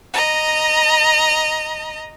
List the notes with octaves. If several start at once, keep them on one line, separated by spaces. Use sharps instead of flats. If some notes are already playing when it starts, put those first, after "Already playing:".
D#5 A#5